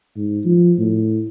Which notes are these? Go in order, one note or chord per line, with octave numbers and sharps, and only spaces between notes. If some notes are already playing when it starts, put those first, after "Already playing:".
G#2
F3
A2